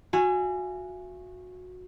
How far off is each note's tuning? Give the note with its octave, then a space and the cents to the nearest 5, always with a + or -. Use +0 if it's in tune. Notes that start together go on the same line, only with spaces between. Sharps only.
F#4 -20 E5 +45 G#5 +0